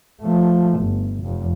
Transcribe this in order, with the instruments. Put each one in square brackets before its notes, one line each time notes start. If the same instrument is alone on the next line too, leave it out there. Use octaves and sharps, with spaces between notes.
[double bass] F3 A3
G1
F1 F2